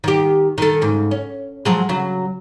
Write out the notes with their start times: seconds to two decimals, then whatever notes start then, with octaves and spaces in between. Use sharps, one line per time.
0.04 D#3 G4
0.58 D#3 A4
0.82 G#2 C#3
1.11 C#4
1.65 F3 F#3 G#3
1.89 C#3 F#3